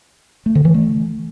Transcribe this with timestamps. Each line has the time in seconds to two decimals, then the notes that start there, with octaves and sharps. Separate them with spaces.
0.46 A3
0.55 D3
0.65 E3
0.74 A3